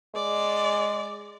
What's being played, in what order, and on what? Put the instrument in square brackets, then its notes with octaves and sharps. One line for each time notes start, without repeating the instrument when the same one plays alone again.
[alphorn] G#3 [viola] D5